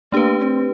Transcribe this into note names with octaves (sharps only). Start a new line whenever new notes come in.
A3 A#3 D4 G4 B4
C#4
C4